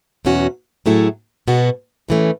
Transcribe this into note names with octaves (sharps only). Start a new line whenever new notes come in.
E2 B2 F#3 C#4 F#4
A2 F#3 A3 E4 G#4
B2 G#3 B3 F#4
A2 E3 A3 C#4